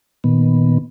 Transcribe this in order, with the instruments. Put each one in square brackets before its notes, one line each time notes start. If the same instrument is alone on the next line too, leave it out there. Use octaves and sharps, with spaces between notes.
[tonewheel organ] A#2 D#3 B3